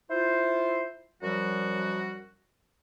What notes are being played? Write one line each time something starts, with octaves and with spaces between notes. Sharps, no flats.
E4 F4 C5
F#2 F3 G3 F#4